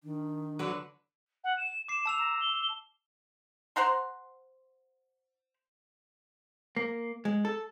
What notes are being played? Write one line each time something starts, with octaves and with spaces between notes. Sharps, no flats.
D#3 D4
D3 F#3 B4
F#5
E7
D6 C7 E7
A5 E6 F7
A#5 E7
G7
C5 F#5 A#5 C6
A#3
G#3
A4